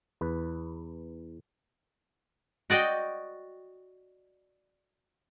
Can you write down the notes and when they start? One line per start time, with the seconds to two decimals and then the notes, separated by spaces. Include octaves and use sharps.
0.21 E2 B4
2.70 F#4 D5 D#5 G5